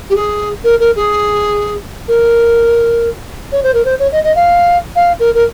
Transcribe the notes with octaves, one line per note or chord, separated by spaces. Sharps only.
G4
G#4
A#4
A#4
G#4
A#4
C#5
C5
A#4
C5
C#5
D#5
D#5
F5
F5
A#4
A#4